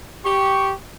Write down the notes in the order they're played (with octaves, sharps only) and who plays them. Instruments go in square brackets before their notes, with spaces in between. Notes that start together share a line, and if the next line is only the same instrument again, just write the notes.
[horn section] G4 [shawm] C#6